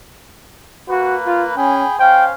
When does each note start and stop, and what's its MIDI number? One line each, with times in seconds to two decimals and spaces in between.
0.89 1.56 58
0.89 1.16 66
0.89 1.56 71
1.26 1.46 65
1.57 1.84 61
1.57 1.96 68
1.57 1.96 79
1.57 1.96 83
1.99 2.35 61
1.99 2.35 72
1.99 2.35 77
1.99 2.24 79